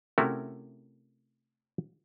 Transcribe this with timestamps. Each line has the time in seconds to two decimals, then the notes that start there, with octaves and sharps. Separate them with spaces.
0.18 C3 A3 C#4 E4 F#4 A#4